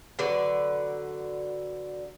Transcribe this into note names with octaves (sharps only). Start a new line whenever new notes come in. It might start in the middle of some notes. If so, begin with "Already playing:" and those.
D3 F#3 B4 D5